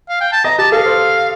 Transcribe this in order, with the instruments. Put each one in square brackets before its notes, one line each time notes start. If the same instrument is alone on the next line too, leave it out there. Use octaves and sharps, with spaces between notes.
[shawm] F5
G5
A5
[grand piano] D#5 [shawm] A#5
[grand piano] G4 [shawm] A5
[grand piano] A4 [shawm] F5
[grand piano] C5